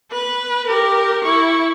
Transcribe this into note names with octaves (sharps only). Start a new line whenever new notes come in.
B4
G4 A#4
E4 C#6